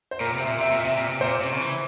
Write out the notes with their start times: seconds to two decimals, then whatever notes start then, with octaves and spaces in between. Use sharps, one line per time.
0.11 C5
0.20 A#2 A#4
0.33 C3
0.41 E5
0.46 A#2
0.58 C3 E5
0.71 A#2
0.80 E5
0.84 C3
0.97 A#2
1.10 C3
1.21 A#2 C5
1.41 C3
1.52 C#3
1.61 E3